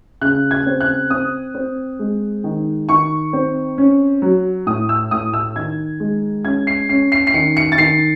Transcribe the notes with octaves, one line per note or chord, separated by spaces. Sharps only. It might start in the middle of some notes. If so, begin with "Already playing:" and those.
C#3 F#6
G#6
C4
F#6
C4 D#6
C4
G#3
D#3
D#3 C#6
C4
C#4
F#3
A2 D#6
E6
A2 D#6
E6
D#3 G#6
G#3
C#4 G#6
C7
C#4 C7
C7
C7
D#3 C#7
C#7
A6
D#3 C7